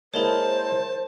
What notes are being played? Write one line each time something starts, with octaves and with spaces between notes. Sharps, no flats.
G#3 A#3 E4 G#4 A#4 C5 C#5 A5